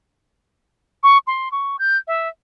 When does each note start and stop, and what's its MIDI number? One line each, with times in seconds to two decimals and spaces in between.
1.03 1.18 85
1.27 1.49 84
1.52 1.76 85
1.79 1.97 91
2.07 2.28 76